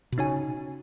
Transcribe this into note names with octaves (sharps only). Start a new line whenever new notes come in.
B2
C#3 D#4 F#4 C#5 G#5